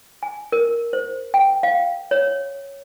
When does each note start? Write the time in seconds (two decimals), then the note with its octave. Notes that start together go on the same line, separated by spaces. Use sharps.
0.23 G#5
0.52 A#4
0.93 C5
1.34 G5
1.63 F5
2.11 C#5